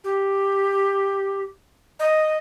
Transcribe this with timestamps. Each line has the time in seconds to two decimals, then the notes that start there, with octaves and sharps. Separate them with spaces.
0.04 G4
2.00 D#5